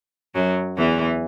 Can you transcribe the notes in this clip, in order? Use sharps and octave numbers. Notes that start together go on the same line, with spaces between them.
F#2 F#3
E2 E3